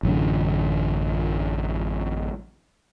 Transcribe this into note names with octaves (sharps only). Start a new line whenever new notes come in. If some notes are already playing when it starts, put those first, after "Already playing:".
A1 F#2 D3